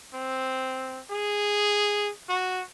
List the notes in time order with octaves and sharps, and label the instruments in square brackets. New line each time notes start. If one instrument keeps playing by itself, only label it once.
[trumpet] C4
G#4
F#4